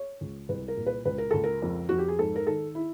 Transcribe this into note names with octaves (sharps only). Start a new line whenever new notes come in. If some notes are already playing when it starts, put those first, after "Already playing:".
Already playing: C#5
C#2
C2 B4
A#4
A#2
B4
C#2 B4
A#4
C#2 A4
A#4
F2
F2 F#4
G4
G#4
G#2 A4
A#4
D#3 A4
E4